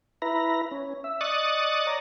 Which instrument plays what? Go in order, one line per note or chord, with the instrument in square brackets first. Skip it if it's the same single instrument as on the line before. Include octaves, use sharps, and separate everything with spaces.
[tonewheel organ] E4 B4 A#5
C#4
E5
D5 D#5 C#6 D#6 F#6 A6
C#5 D5 A#5